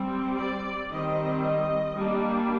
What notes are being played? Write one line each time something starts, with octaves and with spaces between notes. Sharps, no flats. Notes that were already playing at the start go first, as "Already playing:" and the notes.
Already playing: G3 C4
D5
D#3 G3 C4 D#5
D#5
G3 A#3 D4